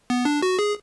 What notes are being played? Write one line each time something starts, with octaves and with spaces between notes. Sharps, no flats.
B3
D4
F#4
G#4